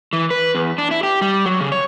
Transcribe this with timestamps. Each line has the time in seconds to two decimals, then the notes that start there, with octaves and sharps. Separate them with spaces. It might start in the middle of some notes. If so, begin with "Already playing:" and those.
0.13 E3
0.30 B4
0.55 E2
0.78 D4
0.91 E4
1.03 G4
1.21 G3
1.46 F#3
1.61 C#3
1.72 C#5